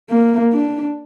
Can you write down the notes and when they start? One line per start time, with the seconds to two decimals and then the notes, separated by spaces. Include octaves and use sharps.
0.10 A#3
0.52 D4